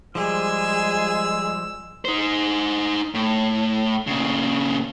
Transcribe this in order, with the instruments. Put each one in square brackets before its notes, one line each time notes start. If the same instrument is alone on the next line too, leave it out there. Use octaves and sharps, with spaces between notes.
[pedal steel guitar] F3 G3 [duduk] G#3 [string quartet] G#4 [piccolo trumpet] E6
[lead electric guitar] D#4 C5
A2
A#2 C#3